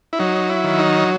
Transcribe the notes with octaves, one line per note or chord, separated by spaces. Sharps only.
E4
F#3 D#4
E4
D#3
D#4